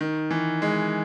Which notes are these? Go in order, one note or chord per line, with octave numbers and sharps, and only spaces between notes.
D#3
E3
G#3